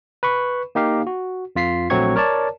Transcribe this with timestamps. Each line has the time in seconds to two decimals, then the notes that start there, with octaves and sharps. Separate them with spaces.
0.23 B4 B5 C#6
0.75 A#3 D#4 G4 F5
1.07 F#4
1.56 F2 F4 B6 C7
1.90 A#1 F#3 A3 C4 C#6 G#6
2.16 A#4 C#5 D5 A5